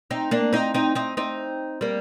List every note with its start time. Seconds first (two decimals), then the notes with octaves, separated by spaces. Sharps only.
0.11 C4 D#4
0.31 A#3 D4
0.53 C4 D#4
0.74 C4 D#4
0.95 C4 D#4
1.17 C4 D#4
1.81 G3 A#3